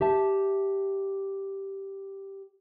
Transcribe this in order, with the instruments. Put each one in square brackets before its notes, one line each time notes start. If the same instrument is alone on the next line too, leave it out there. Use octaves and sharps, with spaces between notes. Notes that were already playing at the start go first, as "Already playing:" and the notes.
[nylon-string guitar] G4 E5 A5